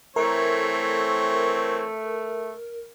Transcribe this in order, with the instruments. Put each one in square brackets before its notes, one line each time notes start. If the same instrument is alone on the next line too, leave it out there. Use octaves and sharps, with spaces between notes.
[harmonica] E3 C4 C#5 [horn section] A3 [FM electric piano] A#4